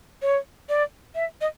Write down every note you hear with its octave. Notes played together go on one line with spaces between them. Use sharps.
C#5
D5
E5
D#5